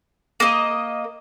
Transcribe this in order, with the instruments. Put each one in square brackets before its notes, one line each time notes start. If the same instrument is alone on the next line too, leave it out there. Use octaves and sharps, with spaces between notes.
[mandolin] A#3 D#5